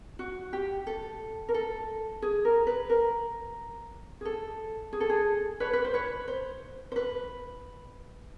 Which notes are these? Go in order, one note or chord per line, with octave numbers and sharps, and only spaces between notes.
F#4
G4
A4
A#4
A4
G#4
A#4
B4
A#4
G#4
A4
G#4
A4
G#4
B4 C#5
B4
C5
B4 C#5
C5
C5
B4